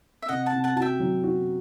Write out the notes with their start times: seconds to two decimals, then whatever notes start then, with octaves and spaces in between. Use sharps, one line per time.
0.22 E5
0.28 C3 D#5 F#5
0.46 F#5 A5
0.52 C3
0.64 F#5 A5
0.76 F#4 A5
0.82 E5 G5
1.00 F#3
1.24 F#4